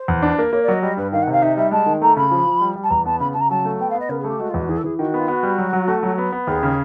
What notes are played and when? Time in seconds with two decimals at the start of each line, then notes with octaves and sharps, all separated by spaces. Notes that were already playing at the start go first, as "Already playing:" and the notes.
Already playing: C5
0.08 E2
0.22 D4
0.38 A#3
0.53 A#3 C#5
0.63 D5
0.68 F#3 D#5
0.82 G3 D#5
0.97 G2 B4
1.12 D#3 F5
1.22 F#5
1.27 C3 F5
1.42 D#4 E5
1.57 G3 E5
1.71 G#3 A5
1.86 D#3
2.01 A3 A#5
2.16 C#3 B5
2.31 F3
2.46 F3
2.61 G3
2.76 G3
2.83 A5
2.90 E2 A#5
3.05 B3 A5
3.20 C#3 B5
3.34 C#3 A5
3.41 A#5
3.50 F#3 A5
3.65 A3
3.79 B3 G5
3.90 F5
3.95 B3
4.00 D#5
4.09 C#3 A#4
4.20 G#4
4.24 A3 G4
4.40 G#3 F#4
4.49 F4
4.54 E2 F#4
4.69 E3 G#4
4.77 A4
4.84 E3 G#4
4.99 D#3 F#4
5.14 B3
5.19 F4
5.28 B3 F#4
5.43 G3
5.58 F#3
5.73 F#3
5.88 A3
6.03 F#3
6.18 B3
6.32 B3
6.47 D#2 G#4
6.63 C#3